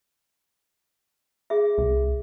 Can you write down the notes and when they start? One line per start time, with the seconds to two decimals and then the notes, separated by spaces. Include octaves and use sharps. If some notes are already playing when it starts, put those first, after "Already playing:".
1.50 G#4 E5
1.78 C2